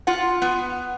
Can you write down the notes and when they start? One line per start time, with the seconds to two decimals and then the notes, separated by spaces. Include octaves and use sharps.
0.07 F4 F#5
0.42 B3